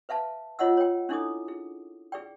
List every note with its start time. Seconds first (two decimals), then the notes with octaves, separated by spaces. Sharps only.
0.09 B4 E5 F5 A5
0.59 F4 C#5 D#5 F#5 E6
0.77 C#5 G5
1.09 C#4 D4 E4 A4 D6 D#6
1.48 G#4
2.12 G#4 D5 G5